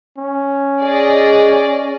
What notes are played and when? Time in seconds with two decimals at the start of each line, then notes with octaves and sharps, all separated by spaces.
0.18 C#4
0.81 G#4 D5 D#5